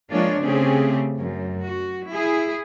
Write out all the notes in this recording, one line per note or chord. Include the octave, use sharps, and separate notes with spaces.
F3 G#3 A#3 D4 F4 C#5
C#3 A3 C4 G4 G#4
F#2
F#4
E4 G#4